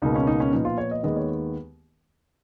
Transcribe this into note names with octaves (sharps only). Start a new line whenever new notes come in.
C#2 B2 A#3 D#4
C#4
D#4
C#4
A#2 F3 B3 D#4
F4
C#5
D#5
D#2 D#3 G#3 B3 D#5
C#5